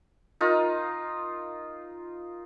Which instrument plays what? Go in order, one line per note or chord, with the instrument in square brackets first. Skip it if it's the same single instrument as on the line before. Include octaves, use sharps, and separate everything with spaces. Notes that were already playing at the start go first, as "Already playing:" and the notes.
[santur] D#4 F4 A#4